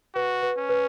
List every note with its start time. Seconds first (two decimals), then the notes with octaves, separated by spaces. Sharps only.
0.15 F#4 B4
0.42 B4
0.57 C#4
0.69 B4